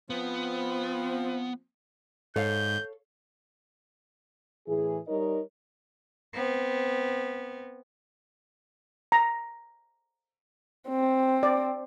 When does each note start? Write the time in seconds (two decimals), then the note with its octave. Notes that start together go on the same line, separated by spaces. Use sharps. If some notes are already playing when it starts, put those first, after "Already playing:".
0.10 F3 B3 C4
2.36 G#2 A4 C#5 F5 G6
4.68 A2 E3 G#4
5.08 G3 D#4 A#4 C#5 D#5
6.35 B3 C4
9.12 A#5
10.89 C4
11.43 D5